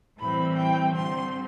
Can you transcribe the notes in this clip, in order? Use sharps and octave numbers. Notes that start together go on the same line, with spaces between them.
A2 E3 G3 C4 B5
G5
D3 G3 C4 C6